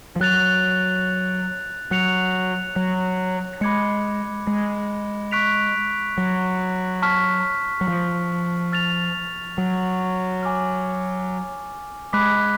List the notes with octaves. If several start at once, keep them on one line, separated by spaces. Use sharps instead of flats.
F3
F#3 F#6 A6 F7
F#3 F#6 C#7 F7
F#3
G#3 B5 D6 G#6 C#7
G#3
C#6 F#6 B6 D7 F7
F#3
A5 C#6 F6 B6
F#3
F3
F6 A6 F7
F#3
G#5 D6 F6
G#3 B5 D6 F#6 B6